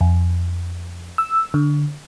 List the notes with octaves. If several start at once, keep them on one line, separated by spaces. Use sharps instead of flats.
F2
E6
D3